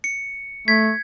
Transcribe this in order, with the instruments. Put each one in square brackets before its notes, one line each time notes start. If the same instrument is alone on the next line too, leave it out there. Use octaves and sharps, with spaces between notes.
[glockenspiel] C#7
[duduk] A3 [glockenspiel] G#6 [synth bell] B6